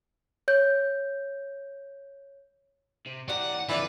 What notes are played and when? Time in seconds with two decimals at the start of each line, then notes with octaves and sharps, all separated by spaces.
0.48 C#5 G6
3.07 C3
3.29 E3 G4 D5 F#5 A#5
3.69 F2 D3 E3 F4 B4 D5